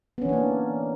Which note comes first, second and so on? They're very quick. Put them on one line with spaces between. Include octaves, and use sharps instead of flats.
B3 C#4 E3 D4 A#3